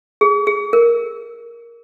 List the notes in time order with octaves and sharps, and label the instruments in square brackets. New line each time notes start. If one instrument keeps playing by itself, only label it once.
[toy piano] G#4
G#4
A#4